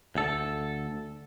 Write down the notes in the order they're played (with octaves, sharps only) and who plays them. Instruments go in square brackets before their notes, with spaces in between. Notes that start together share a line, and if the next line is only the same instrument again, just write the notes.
[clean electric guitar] D2 A4